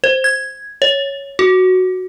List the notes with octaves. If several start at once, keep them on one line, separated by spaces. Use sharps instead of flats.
C5
G#6
C#5
F#4